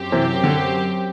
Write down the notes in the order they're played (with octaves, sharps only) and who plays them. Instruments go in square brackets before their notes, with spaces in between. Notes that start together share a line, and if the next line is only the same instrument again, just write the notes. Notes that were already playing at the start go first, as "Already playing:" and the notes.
Already playing: [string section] F#2 F#3 C4 G4
[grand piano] C3 E3
D3